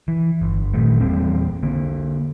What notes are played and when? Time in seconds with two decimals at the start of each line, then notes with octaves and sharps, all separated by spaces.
0.08 E3
0.42 G1
0.74 A#2 D#3 A3
1.01 E2 G3 A#3 C4
1.63 D3 A#3